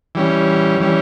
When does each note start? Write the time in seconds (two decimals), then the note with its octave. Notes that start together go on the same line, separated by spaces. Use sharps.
0.15 E3 G3 C#4
0.80 E3 G3 C#4